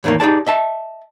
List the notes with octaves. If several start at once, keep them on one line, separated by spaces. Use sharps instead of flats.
E2 A2 D#3 G#3 A#3
D#4 G4 G#4 D5 A5
D#5 E5 A5